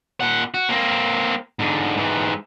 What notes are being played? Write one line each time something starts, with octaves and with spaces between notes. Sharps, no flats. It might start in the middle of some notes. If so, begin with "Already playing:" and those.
A#2 F#5
F#4
A#3 C4
G#2 D3
G#2 E3